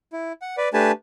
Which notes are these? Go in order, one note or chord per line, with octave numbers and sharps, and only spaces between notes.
E4
F#5
B4 D5
A3 D4 G4 B4 G#5 A5